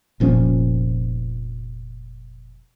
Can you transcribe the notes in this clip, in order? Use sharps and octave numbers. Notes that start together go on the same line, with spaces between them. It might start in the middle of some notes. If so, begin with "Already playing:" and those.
F1 A#2 F3 C#4